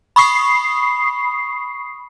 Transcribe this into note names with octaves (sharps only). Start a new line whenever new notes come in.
B5 C#6 D#6 C7